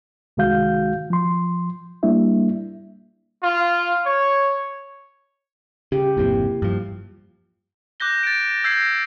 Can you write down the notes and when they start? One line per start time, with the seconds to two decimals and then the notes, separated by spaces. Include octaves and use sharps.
0.37 C2 D#3 G#3 F#4 F5 G6
1.10 F3 C6
2.03 G3 A#3 D4 E4 E5
3.43 F4
4.06 C#5
5.92 C#3 G4
6.17 G#1 F2 C3 A#3 E4
6.62 G2 F3
8.00 D6 F#6 G6 A#6 G7
8.23 A6 D7
8.64 E6 G6 G#6 A#6 C7